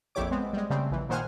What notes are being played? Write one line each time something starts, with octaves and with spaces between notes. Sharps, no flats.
A#1 F2 E4 G4 C#5 D6
G#3 B3 C4
G3 G#3
C#3 G3 A3 C4
A#1 E3
A#2 D#3 C5 F#5 G#5 F6